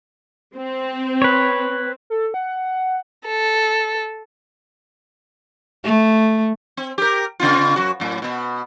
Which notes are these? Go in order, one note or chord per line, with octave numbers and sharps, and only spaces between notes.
C4
B4 C#5
A4
F#5
A4
A3
C4
G4 A#4
C#3 C4 F4
F#2 F#4
F#2 A2
B2 B3